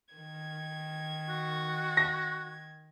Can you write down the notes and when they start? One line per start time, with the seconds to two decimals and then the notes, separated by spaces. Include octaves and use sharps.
0.15 D#3 G#6
1.29 F#4
1.97 A#6